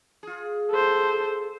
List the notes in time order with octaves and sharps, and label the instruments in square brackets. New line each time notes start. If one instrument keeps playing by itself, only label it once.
[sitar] F4 G#4
[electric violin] A4 C5